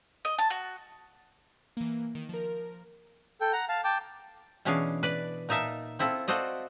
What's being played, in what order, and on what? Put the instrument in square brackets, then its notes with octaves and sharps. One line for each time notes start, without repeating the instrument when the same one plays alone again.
[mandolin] D#5
A5
F#4
[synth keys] E3 A#3
D#3
F3 A#4
[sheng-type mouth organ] A4 G5
F#5 A#5
F5 A5
G5 A5 D6
[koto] B2 E3 C#4 D4 G#4 F5
B4 D5
A#2 D#4 A#4 E5 A5
C4 E4 F4 A4
F4 F#4 A4 C5 D5 D#5